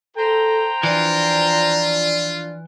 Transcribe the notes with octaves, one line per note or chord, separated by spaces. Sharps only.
A4 C5 G5 A#5
E3 F3 D4 F4 D5